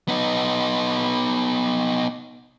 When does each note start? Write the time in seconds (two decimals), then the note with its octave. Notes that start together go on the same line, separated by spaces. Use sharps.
0.08 B3 D#4